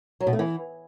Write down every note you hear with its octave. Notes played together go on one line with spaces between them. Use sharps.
F#3
B2
A3
E3